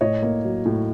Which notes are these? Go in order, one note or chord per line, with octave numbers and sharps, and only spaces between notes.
A2 C#5 D#5
A#3
F#3
A2